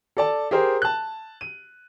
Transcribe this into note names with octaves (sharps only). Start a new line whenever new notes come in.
A4 D5 A5
G4 G#4 A#4 C5
A5 F#6
D#7